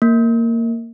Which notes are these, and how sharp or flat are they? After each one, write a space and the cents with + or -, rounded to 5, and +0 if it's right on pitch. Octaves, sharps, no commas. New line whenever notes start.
A#3 -15